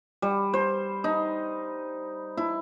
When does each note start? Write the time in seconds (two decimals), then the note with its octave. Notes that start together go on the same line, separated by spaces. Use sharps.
0.22 G3
0.54 C5
1.04 D#4
2.37 E4